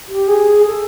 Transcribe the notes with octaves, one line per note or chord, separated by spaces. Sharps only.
G4
G#4
A4